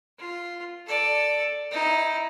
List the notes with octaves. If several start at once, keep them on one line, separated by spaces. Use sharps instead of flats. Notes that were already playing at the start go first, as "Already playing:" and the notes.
F4
A4 D5
D#4 E4